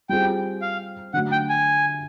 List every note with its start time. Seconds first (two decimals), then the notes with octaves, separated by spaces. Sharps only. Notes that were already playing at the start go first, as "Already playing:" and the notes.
0.09 G3 C4 F4 G#4 G5
0.62 F5
1.13 D3 F#3 A3 F#5
1.32 G5
1.49 G#5